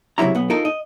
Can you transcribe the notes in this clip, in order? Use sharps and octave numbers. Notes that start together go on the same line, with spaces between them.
C#2 C3 F#3 E4 A#5
B1 B3
D#4 F4 A4 A#4
D#5